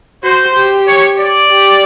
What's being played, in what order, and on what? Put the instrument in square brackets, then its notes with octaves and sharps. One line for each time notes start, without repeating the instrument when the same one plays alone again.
[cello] F#4 [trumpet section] C5
[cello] G4
[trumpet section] C#5
D5
[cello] G4